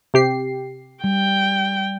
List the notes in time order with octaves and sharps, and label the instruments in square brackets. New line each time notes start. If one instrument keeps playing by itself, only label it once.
[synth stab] C3 G4 C7
[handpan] G3 [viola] G5